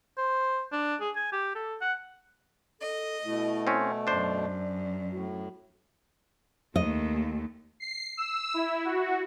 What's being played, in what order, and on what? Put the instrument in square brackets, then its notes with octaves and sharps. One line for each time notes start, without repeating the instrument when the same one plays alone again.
[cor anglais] C5
D4
G#4
G#5
G4
A4
F#5
[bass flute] A4 [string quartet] D#5
[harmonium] B2 A3 [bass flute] E4
[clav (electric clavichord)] C4 C#4
[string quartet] F#2 [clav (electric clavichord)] D4 C5 [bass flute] D5
[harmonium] A2 [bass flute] F#4
[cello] D#2 A3 [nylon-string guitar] D#5
[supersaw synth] C7
E6
E4
F#4